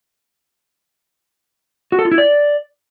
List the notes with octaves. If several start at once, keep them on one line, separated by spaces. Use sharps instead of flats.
F#4
A4
F4
E4
D5